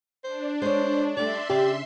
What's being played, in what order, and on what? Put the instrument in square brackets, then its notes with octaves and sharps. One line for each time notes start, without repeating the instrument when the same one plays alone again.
[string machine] D4 [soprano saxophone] C5
[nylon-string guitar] G#3 C#5 [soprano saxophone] C5
[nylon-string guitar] G3 A3 [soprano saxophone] D5 [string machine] E5 C6
[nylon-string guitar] C#3 [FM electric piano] G4 [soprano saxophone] D5